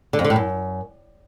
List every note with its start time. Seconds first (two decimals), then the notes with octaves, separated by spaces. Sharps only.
0.13 D3
0.19 F2
0.24 D3
0.30 A2
0.36 F#2